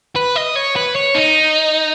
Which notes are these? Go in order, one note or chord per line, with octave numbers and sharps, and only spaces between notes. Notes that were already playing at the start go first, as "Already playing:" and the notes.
B4
D#5
C#5
B4
C#5
D#4